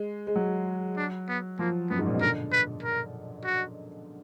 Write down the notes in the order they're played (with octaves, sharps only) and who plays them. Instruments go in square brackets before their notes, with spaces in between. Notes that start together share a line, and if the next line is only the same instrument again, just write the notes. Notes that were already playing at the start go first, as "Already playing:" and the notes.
Already playing: [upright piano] G#3
G#3
F#3
[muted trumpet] D4
B3
[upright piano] F3 [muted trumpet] A#3
[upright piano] F#2 [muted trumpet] B3
[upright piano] G#2
A#2
B2
[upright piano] D3 [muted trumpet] A#4
[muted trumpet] B4
A#4
F#4